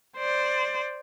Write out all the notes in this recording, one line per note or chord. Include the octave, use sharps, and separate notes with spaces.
C5 D5